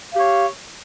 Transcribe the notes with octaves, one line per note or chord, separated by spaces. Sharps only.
G4 C#5 F5